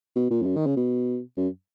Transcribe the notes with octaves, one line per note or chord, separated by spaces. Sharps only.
B2
A#2
F2
F#2
D#3
C#3
B2
F#2